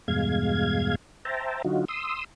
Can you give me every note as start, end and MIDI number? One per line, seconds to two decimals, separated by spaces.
0.08 0.95 40
0.08 0.95 43
0.08 0.95 47
0.08 0.95 56
0.08 0.95 77
0.08 0.95 92
1.25 1.62 72
1.25 1.62 76
1.25 1.62 79
1.25 1.62 81
1.25 1.62 82
1.65 1.85 50
1.65 1.85 54
1.65 1.85 63
1.65 1.85 65
1.65 1.85 66
1.88 2.24 84
1.88 2.24 87
1.88 2.24 88